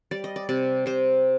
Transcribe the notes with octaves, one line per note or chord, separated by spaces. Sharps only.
G3 D5
D#5
D5
C3 D5
C3 C5